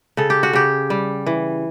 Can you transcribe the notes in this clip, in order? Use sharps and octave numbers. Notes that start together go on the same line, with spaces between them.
C#3 A4
G4
F#4
C#3 G4
G3
E3